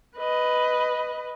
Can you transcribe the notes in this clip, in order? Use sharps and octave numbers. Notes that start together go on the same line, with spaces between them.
B4 D#5